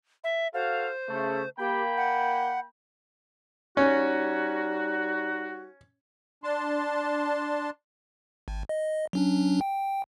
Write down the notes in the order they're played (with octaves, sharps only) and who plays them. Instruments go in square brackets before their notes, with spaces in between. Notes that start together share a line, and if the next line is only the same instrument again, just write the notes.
[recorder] E5
[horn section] F#4 A4 F5 [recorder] C5
[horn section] C#3 A3
[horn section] A#3 G5 B5 [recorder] G4
[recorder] F#5
[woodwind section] G3 D#4 F#4 [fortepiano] C#4
[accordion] D4 A5 C6
[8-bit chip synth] G#1
D#5
F#3 C#4 D4
G5